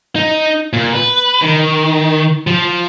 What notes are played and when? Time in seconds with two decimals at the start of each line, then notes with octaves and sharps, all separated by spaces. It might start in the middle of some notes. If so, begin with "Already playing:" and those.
0.16 D#4
0.73 A#2
0.93 B4
1.42 D#3
2.47 F3